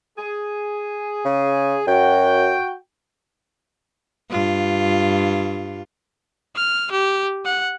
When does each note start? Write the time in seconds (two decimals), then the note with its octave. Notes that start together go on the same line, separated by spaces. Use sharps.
0.17 G#4
1.25 C#3
1.87 F#2 F#4 G5
4.30 G2 F4
6.56 F6
6.92 G4
7.45 F#5